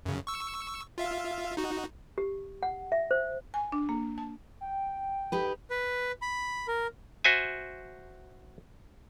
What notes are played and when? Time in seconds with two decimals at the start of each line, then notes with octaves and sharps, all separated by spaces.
0.06 F#2 C#3
0.27 C#6 E6
0.98 F4 E5 F5
1.57 D#4 F#4
2.18 G4
2.63 F#5
2.92 E5
3.11 C5
3.54 G#5
3.72 D4
3.89 A#3
4.18 A5
4.61 G5
5.32 D#4 G4 B4
5.70 B4
6.22 B5
6.68 A#4
7.24 F#4 C5 E5 G#5